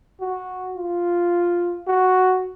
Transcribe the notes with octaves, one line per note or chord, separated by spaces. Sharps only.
F#4
F4
F#4